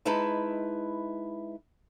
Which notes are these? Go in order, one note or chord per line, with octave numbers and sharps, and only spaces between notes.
G#3 D#4 E4 B4 E5 A5